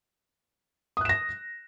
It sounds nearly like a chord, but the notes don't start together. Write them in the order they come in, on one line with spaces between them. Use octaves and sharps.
D#6 F#6 E7 A#6